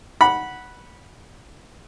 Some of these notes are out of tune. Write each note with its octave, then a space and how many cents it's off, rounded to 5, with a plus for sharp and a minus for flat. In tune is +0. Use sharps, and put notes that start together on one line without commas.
F#5 +0 B5 -15